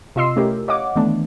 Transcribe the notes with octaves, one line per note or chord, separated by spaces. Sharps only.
C3 F4 D#5 C6 E6 C7
A3 C#4 E4 G4 A#4
C#5 D#5 F5 F#5 D6
D#3 E3 A3 B3 D4